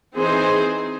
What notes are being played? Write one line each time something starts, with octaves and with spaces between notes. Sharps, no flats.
E3 C4 D#4 G#4 C5